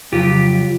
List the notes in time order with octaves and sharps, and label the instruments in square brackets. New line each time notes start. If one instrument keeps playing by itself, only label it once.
[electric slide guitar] F2 C#3 F#3 F4 G4